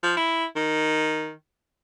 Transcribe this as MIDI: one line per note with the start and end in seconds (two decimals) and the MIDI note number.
0.03 0.16 53
0.17 0.45 64
0.56 1.32 51